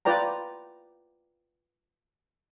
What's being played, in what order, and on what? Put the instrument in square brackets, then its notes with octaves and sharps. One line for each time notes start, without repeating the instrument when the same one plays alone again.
[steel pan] F4 B4 D5 G5 A#5